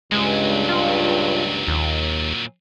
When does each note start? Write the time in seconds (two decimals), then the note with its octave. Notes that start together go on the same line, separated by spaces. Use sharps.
0.12 C#2 G2 A#2 F#3 G#3
0.69 F4
1.68 D#2